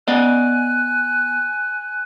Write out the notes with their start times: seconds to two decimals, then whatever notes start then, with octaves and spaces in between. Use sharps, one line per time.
0.08 B3 D5 D#5 G#5 F#6